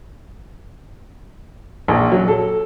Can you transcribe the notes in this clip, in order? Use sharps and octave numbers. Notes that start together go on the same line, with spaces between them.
A#1
F#3
A4